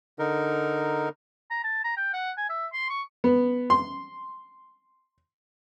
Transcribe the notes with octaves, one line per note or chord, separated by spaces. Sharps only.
D3 D#4 A#4
A#5
A5
A#5
G5
F#5
G#5
E5
C6
C#6
B3
C6